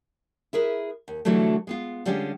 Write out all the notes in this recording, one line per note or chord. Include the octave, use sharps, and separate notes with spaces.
E4 G#4 A#4 B4
D#2
B2 D3 E3 F#3 G3 A3
G#3 B3 F4
D3 G3 G#3 C#4 F4 G4